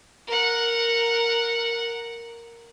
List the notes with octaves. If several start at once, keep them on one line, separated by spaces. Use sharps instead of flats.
A#4 F#5